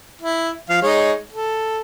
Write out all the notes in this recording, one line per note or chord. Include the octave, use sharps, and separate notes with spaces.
E4
F3 F5
G#3 D#4 C#5
A4